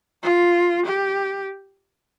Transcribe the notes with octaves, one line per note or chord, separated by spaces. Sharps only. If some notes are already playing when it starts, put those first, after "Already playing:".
F4
G4